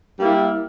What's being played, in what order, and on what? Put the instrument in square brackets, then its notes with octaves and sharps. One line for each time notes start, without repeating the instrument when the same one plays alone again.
[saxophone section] G3 A#3 E4